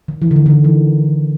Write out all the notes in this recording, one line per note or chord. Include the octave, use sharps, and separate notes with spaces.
D#3
E3
D3
D#3
D3
D#3
E3